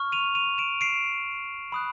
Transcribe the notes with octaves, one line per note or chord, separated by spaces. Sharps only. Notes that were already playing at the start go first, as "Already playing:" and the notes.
Already playing: C#6 F6
D#7 F7
D#7 F7
D7 E7
C7 D7
B5 D#6 F#6